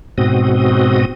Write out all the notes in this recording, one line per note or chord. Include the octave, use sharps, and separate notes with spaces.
G#2 B2 C4 F#4 D#6